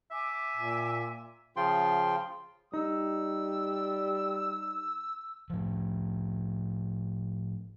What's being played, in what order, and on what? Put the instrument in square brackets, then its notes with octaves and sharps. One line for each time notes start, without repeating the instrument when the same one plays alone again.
[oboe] E5 [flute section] G#5 D6
[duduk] A#2
[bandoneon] C#3 F3 F4 G5 C6
[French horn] G3 [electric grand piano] D#4 [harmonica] E6
[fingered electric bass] A2 F3